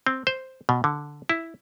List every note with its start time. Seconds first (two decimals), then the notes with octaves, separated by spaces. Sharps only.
0.07 C4
0.27 C5
0.69 B2
0.84 D3
1.29 E4